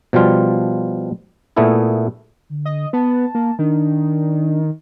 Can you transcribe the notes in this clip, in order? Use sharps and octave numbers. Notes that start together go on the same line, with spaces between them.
B2 F3 G3 F4
A#2 A3 B3 E4 G#4
D3
D#5
B3 A5
A#3
D#3 D4